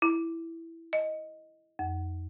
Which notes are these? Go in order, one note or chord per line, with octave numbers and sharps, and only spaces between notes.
E4
D#5
F2